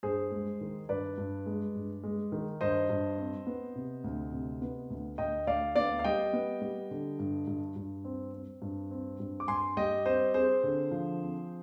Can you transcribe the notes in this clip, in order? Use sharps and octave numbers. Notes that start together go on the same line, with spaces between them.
G2 G#4 C5
G#3
D#3
G2 B4 D5
G2
G#3
G2
G#3
D#3
G2 C5 D#5
G2
C4
B3
C3
D2
C3
B3
D2
D2 D#5 G5
D2 D5 F5
B3 D5 F5
F5
G3 D#5 G5
B3
G3
D3
G2
G2
G2
C4
C4
G2
C4
G2
D6
G2 G#5 C6
G3 D#5 G5
C4 C5 D#5
C4 G#4 C5
D3
F3
C4